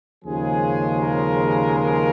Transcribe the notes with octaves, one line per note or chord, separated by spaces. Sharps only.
D#2 C#3 F3 G#3 G#4
A#4
A#4